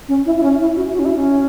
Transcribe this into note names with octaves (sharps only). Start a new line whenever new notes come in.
C#4
E4
E4
C#4
E4
F#4
F#4
C#4
E4
C#4